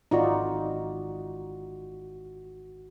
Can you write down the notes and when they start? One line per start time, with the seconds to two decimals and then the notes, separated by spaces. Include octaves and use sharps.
0.11 G#1 D#4 F4 F#4 D5